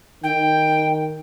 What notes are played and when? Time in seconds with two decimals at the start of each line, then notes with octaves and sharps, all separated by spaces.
0.24 D#3 G5